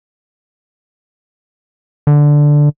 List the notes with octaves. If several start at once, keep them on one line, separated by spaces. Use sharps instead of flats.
D3